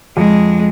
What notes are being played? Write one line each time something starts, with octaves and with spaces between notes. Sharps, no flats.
F2 G#3